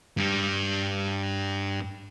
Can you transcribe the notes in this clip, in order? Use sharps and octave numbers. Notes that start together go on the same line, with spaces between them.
G2 G3